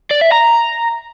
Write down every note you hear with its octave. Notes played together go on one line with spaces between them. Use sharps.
D5
E5
A#5